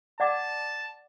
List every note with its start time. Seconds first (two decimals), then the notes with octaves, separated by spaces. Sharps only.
0.20 D5 F#5 A5 D6